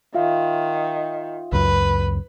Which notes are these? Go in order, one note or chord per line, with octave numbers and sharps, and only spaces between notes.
D#3 F4 E5 F5
C#2 F#2 B4